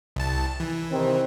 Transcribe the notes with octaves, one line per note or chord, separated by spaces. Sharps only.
C2 A5
E3
C3 D#3 C4